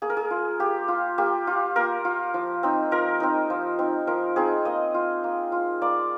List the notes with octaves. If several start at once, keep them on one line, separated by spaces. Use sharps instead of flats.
A#3 G#4
A#4
G#4
F4
A#3 G4
F4
A#3 G4
F4
A#3 A#4
F4
F3
C4 D#4
F3 A#4
C4 D#4
F3
C4 D#4
F3 A#4
C4 D#4 G#4
A#3 D#5
F4
A#3
F4
A#3 D5